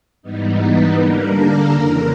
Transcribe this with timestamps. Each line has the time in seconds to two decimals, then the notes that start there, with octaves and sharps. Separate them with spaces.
0.22 G#2 E3 G3 B3 D#4
0.59 B4
0.96 D3 G3 A#3 D4 A#4
1.33 A4
1.70 F2 C#3 E3 A#4